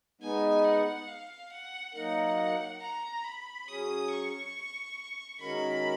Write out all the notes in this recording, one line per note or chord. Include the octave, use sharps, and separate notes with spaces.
G#3 B3 D#4 G#5
F#5
F5
F#5
F#3 A#3 D#4 A#4 F#5
A#5
B5
F#3 C#4 G#4 D#6
C#6
D#3 G#3 C#4 F#4 A#4 B5